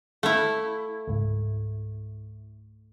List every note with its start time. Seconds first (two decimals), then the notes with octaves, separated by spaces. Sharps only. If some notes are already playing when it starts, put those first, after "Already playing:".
0.23 A3 E4 F5
1.07 C#2 G#2